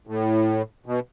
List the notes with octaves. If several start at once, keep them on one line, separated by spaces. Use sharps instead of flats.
A2
B2